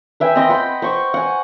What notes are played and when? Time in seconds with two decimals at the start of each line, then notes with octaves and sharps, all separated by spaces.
0.20 B4 E5 G5 G#5
0.35 C4 D#5 G5 C6
0.49 F#5 G5 B5
0.82 C5 C6 C#6
1.14 F#5 G#5